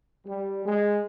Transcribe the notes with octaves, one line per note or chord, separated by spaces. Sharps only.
G3
G#3